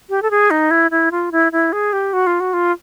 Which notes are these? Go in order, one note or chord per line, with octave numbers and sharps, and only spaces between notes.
G4
A4
G#4
D#4
E4
E4
F4
E4
E4
G#4
G4
F#4
F4
F#4
F4